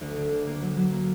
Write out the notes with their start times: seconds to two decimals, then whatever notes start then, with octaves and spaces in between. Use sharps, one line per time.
0.01 D2
0.17 D3
0.32 D2
0.47 A#3
0.62 F#3
0.77 F#3
0.92 A#3